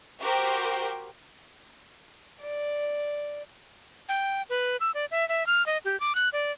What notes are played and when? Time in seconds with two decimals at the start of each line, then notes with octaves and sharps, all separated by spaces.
0.21 F#4 G4 A#4 C5 G5
2.42 D5
4.09 G5
4.50 B4
4.81 E6
4.95 D5
5.11 E5
5.29 E5
5.47 F6
5.66 D#5
5.85 G4
6.00 D6
6.15 F#6
6.33 D5